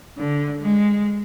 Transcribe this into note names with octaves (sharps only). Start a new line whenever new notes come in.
D3
G#3